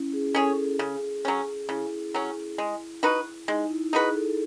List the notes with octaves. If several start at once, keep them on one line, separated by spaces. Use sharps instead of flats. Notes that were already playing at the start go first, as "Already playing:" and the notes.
Already playing: C#4 E4
G#4
C#4 G#4 A4 C#5
G#4
C#3
F#3 C#4
C#3 E4
F#3 C#4
G#3
D#4 F#4 B4
G#3 D#4
E4
D#4 F#4 G#4 B4
A4